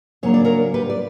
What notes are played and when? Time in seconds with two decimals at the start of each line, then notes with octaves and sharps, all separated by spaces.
0.23 C#3 F#3 A#3 D4 C#5
0.34 D5
0.44 A#4 C#5
0.74 G4 B4
0.90 D5